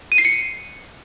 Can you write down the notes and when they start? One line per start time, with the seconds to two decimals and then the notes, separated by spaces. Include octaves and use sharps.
0.12 D#7
0.18 C7
0.25 C#7